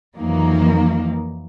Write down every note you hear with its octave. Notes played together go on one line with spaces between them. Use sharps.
F2 D#3 E3 F#3 A#3 D#4